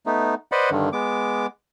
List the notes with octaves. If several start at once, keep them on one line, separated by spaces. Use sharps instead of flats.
A3 B3 D#4
B4 C5 D5 D#5 F#5 B5
G2 D3 D#3
G#3 B3 D6